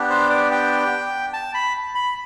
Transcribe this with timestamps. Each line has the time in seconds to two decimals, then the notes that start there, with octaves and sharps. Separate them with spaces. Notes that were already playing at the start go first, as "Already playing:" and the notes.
Already playing: B3 D4 G4
0.10 C5
0.30 D5
0.51 G5
1.33 A5
1.54 B5
1.95 B5